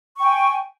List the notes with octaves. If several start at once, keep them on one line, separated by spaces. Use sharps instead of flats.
G5 G#5 C#6